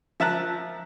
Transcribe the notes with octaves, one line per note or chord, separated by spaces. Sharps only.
F3 E5 A5 A#5 F#6